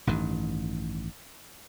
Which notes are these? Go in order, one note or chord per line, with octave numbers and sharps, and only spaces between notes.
A1 G2 D#3